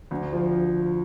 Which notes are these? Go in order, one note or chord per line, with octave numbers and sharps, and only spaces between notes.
D2
F3